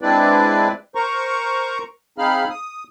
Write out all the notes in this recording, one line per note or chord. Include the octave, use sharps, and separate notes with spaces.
G#3 C4 D4 E4 B4 D5
A#4 C5 A#5 C#6
C4 D#4 G#4 F5 B5 F6
D#6